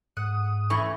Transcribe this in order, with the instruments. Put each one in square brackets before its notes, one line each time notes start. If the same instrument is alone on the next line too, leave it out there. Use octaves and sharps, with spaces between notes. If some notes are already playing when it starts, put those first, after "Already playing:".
[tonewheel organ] G#2 D#6 [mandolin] F#5
[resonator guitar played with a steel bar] E3 A3 C#4 [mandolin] C#6